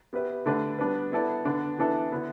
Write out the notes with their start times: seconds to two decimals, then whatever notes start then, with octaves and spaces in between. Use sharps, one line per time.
0.13 B3 G4 B4 E5
0.46 D3 A3 D4 B4
0.78 G3 B3 D4 B4
1.12 B3 E4 A4 D5
1.45 D3 B3 D4
1.78 E3 B3 D4 A4 E5
2.12 D3 B3 E4